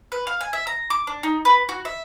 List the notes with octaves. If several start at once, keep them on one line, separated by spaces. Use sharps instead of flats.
B4
F5
G#5
E5
A#5
D6
D4
D#4
B4
F#4
E5